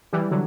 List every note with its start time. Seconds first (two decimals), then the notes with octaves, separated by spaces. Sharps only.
0.13 E3 G3
0.31 D3 F#3